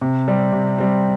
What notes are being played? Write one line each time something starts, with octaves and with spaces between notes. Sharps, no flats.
C3
G3 C4
C3
G3 C4